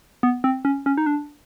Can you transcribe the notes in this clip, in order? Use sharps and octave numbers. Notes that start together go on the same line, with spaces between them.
B3
C4
C#4
C#4
D#4
D4